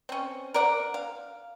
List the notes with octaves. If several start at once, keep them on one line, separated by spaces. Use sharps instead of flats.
C4 C#4
A#4 D5 F#5
F5